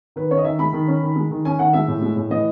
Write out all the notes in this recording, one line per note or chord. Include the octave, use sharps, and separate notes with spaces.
D#3 B4
C#4 C#5
D#5
D#3 E5
G#3 B5
D#3
C#4
D#3
G#3
D#3
C#4 G#5
D#3 F#5
G#3 E5
A2
G#3
A2
E3 D#5